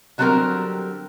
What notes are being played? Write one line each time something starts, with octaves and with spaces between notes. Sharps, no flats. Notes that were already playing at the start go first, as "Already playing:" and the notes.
D3 F#3 G3 C4 G4 A#4